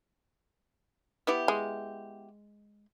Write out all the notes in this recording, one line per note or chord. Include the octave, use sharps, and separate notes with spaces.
B3 E4 G4
G#3